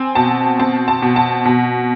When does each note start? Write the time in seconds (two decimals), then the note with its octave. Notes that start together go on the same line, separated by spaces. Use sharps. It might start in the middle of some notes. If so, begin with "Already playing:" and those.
Already playing: C4 G#5
0.15 B2 A5
0.59 C4 A5
0.88 A5
1.02 B2
1.16 A5
1.45 B2